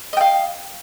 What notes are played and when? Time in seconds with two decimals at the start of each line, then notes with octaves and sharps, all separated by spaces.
0.13 D#5
0.17 G5
0.21 F5